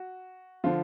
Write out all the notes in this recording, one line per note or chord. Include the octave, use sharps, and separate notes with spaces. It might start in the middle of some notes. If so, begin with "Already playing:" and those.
Already playing: F#4
D3 F3 F4